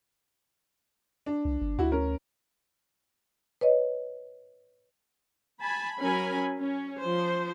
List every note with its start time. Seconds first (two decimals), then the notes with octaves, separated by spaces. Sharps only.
1.26 D4
1.45 C2
1.61 G1
1.79 D2 E4 F#4
1.92 C#4 A#4
3.61 B4 C#5 D#5
5.61 G#5 A5 B5
6.00 F#3 C#4 A#4 G#5 B5
6.59 C#4
7.00 F3 C5